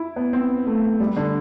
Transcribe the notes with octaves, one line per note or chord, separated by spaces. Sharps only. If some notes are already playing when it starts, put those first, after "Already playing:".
Already playing: E4
B3
C4
A3
G3
D3